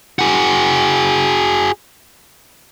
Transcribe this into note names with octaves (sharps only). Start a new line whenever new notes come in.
F#4 G#4